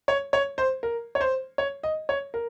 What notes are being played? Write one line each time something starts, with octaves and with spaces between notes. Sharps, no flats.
C#5
C#5
C5
A#4
C#5
C5
C#5
D#5
C#5
A#4